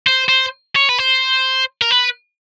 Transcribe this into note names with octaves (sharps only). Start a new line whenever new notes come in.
C5
C5
C#5
B4
C5
A#4
B4